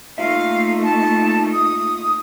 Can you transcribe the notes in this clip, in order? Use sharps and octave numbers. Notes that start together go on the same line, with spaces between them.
A3 A#3 D#4 F4 E5 F5
A5
D#6